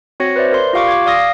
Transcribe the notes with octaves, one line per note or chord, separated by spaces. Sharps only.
C4 F#4 C#5 A#6 C#7
B4 C5 D5 E5
A#4 D5 C6
F4 G4 F5 C#6 D6
D6 G#6
D5 F5 D#6 A#6